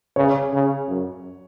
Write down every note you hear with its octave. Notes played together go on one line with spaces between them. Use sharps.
C#3 C#5
C#3
F#2